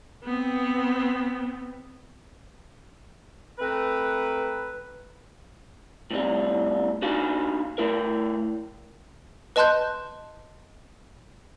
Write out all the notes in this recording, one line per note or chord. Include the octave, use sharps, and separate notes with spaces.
B3 C4
A3 C4 A#4 B4
A2 C3 G3
D4 D#4 F#4 F5 G#5
A3 E4 A#4
B4 D#5 A5 C6 F#6 G6